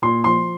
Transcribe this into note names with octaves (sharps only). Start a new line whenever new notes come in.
A#2 C6
F3 C6